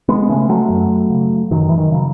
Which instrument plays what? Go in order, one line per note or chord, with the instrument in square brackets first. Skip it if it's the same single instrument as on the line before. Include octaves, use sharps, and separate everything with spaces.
[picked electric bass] G#3 B3
C#3 A3 C#4
F#3 A3
F#2
C#3
F#2 D#3 F#3
E3
D#3
C#3 F#3